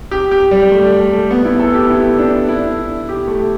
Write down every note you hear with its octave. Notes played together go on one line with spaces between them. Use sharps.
G4
G4
G3
A3
A3
B3
E4
A4
G4
E4
D4
E4
G4
A3